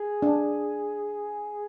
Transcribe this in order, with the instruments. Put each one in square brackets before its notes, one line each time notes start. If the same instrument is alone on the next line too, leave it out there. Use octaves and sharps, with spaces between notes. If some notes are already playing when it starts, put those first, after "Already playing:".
Already playing: [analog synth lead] G#4
[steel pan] D4